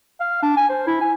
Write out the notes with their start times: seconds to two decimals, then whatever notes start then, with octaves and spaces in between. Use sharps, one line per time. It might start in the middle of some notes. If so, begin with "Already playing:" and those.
0.20 F5
0.43 D4
0.57 G#5
0.70 C5
0.87 E4
1.01 G#5